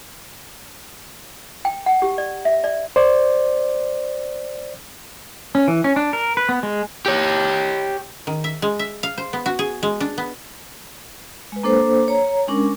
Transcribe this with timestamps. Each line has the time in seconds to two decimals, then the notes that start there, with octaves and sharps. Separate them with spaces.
1.65 G5
1.86 F#5
2.02 G4
2.18 D5
2.45 E5
2.64 D5
2.96 C5 D5
5.55 C#4
5.68 E3
5.84 C#4
5.96 D4
6.13 A#4
6.37 B4
6.49 B3
6.63 G#3
7.06 G4 C#5
8.27 D#3
8.44 E5
8.62 G#3
8.79 E5
9.03 F5
9.18 C5
9.33 B3
9.46 F#4
9.59 G#4
9.83 G#3
10.00 D4
10.18 B3
11.52 G#3 B4
11.63 A#3 D4 A4 C5
12.08 C#5 A#5
12.48 G#3 C#4 D4 A#4